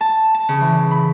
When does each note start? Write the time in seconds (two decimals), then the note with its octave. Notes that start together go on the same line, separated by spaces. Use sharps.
0.01 A5
0.34 A5
0.49 C#3
0.61 E3
0.91 B5